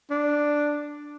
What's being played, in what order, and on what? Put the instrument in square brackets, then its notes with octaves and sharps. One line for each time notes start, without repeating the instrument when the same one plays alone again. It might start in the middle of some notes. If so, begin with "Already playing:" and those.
[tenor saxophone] D4